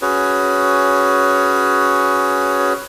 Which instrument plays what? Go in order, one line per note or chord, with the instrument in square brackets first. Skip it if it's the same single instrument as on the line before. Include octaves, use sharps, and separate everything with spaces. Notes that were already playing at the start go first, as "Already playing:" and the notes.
[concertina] C#4 F#4 G#4 B4 C#5